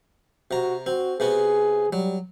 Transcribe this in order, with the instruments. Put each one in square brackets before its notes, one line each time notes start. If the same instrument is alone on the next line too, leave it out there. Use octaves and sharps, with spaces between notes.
[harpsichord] C3 A#5 [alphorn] F#4
[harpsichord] C4 [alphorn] F#4
[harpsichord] C3 B3 F#4 [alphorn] G#4
[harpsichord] F#3 [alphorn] G3